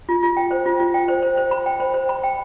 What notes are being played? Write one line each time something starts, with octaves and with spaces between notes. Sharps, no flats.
F4
F4
G5
C5
F4
F4
G5
C5
C5
C5
B5
G5
C5
C5
B5
G5